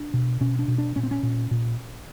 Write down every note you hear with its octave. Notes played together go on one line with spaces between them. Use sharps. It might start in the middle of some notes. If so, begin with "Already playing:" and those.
Already playing: D4
B2
B2 C#4
D4
B2
D4
A#2 C#4
C4
C#4
A#2
A#2